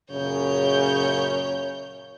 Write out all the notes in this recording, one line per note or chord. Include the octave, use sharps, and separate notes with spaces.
F#2 A#2 C#3 C#5 G6